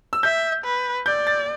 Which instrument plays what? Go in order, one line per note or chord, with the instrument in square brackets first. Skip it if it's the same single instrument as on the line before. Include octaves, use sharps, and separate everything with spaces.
[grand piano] E6
[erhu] E5 [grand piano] G6
[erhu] B4
[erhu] D5 [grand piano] G6
[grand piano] A6